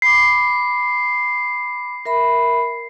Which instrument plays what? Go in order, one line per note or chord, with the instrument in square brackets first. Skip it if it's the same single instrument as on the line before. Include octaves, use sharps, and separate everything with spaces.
[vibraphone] B5 D6 [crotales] C7
[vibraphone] A#4 E5 B5